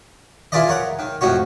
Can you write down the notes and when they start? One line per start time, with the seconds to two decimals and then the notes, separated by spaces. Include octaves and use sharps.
0.52 E4 F4 G#4 B4 D5 D#5
0.68 A#4 C#5 F#5
0.99 D#3
1.21 F2 A2 D#4 F#4 C#5